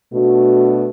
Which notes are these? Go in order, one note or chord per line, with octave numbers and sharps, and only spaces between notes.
B2 A3 D4 F#4